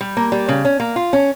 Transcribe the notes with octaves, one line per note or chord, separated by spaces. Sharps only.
G3
A#3
G3
C#3
C#4
A#3
F4
C#4